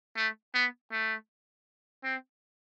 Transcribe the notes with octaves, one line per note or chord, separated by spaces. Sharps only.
A3
B3
A3
C4